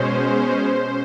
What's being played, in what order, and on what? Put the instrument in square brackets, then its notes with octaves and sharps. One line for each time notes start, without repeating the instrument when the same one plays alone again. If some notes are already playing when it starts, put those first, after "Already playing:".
Already playing: [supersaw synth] B2 G#3 C#4 C5